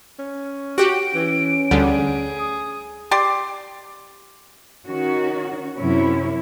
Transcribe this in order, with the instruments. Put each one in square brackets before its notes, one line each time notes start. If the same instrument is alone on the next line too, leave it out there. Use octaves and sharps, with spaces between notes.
[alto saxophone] C#4
[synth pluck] F#4 G4 [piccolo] D7
[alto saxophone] E3 [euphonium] C#4
[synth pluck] D2 D3 G3 [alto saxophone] G#4
[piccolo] D#6
[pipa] G4 D5 C6
[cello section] D#3 C#4 F#4
F#2 C3 F#3 C#4 E4